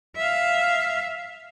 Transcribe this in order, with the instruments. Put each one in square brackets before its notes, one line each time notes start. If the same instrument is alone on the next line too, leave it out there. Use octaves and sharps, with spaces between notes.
[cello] E5 F5